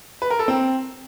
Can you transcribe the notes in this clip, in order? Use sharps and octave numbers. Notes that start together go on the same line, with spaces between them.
B4
A#4
A4
C4